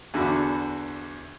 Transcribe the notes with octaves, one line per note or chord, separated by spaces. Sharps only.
E2 D3 F#4 B5